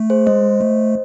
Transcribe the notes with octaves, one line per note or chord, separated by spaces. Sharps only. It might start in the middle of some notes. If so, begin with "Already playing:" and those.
Already playing: A3
G#4 C5
G#3 C5 D#5
A3